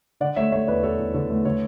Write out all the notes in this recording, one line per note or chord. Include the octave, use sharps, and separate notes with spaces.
D3 D5 F#5
A3 C#5 E5
A3 C#5 E5
E2 B4 D5
E2 A4 C#5
E2
D3 A4 C#5
A3
D3 A4 C#5